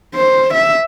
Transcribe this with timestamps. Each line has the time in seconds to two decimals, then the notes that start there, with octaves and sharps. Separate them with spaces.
0.15 C5
0.54 E5